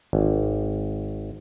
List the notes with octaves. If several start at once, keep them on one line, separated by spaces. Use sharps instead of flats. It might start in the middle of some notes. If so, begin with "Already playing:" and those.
G#1